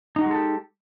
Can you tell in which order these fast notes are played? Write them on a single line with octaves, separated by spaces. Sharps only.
D#4 F#4 G#3 A4 G4